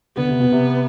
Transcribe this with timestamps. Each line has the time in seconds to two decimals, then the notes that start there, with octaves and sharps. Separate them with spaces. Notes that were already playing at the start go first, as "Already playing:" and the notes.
0.17 D3 B3
0.29 C3
0.40 B2
0.52 C3